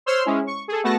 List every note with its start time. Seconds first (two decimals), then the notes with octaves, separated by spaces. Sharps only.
0.06 C5 C#5 C6 E6 F6
0.25 G#3 C#4 E4
0.47 C#6
0.68 G#4 A4
0.83 A3 B3 F#4 A5 A#6